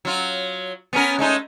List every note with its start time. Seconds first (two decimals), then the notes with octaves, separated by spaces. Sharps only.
0.05 F#3 F4
0.93 B3 C#4 A#4
1.19 G#3 A3 D#4